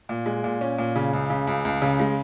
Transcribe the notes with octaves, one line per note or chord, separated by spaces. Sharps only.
A#2
G#3
A#2
C#4
A#2
C#3
C#2
C#3
C#2
C#2
C#3
G#3